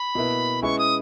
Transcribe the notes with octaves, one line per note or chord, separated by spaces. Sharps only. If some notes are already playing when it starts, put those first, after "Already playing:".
Already playing: B5
B2 A#3 E4 B4
G#3 C#4 E4 B4 C#6
D#6